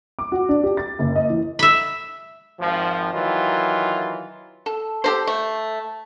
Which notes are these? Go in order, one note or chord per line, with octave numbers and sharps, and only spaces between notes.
D6
F#4
D4
G4
A6
F#1
D#5
E3
E5 B5
G#1 F3
D#3 E3 F#3 F4
A4
G4 A4 C5
A3